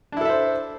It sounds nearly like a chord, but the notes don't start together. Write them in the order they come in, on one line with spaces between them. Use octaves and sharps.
D4 E4 A4 E5 C5